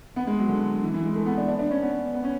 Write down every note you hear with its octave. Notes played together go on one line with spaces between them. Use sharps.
B3
G#3
F#3
D3
E3
E3
G#3
A3
B3
D4
D4
D4
C#4
B3
B3
C#4